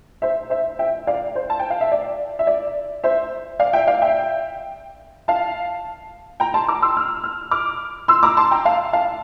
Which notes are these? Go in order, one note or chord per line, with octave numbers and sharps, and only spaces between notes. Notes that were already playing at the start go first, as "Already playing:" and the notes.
C5 E5
C5 E5
E5 G5
D5 F5
C5
A5
G5
F5
E5
D5
E5
D5
C5 E5
D5 F5
E5 G5
D5 F5
E5 G5
F5 A5
G5 A#5
A5 C6
A#5 D6
C6 E6
F6
F6
D6 F6
C6 E6
A#5 D6
A5 C6
G5 A#5
F5 A5
F5 A5